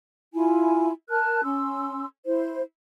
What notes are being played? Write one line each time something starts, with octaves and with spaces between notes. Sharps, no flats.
E4 F4 G#5
A#4 A5 F6 F#6
C#4 C6 E6
E4 C5